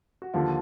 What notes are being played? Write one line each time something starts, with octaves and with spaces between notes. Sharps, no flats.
F#4
D#2 D3 F3 F4